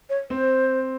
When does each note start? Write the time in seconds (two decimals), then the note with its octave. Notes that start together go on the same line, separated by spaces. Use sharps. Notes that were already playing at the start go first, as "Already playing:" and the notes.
0.10 C#5
0.30 C4 C5